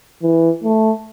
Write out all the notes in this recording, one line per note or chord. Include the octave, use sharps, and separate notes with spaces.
E3
A3